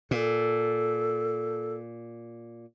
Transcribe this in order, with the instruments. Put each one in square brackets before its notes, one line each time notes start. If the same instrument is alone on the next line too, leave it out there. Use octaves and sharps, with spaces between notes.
[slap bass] A#2 [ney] A4